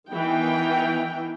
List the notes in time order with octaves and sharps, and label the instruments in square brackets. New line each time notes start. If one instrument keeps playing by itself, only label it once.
[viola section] D#3 E3 B3 G5